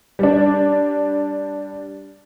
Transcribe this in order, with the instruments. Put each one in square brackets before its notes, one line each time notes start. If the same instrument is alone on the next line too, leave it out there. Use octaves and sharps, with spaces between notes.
[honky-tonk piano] G3 D4